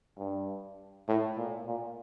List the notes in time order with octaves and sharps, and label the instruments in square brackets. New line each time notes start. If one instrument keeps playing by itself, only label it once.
[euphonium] G2
A2
A#2
A#2